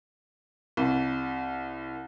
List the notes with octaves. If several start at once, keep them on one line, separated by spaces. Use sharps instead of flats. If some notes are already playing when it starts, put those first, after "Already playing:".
C2